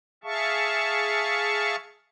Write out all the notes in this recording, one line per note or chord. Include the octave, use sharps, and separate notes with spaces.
G#4 E5 F5 A5 C#6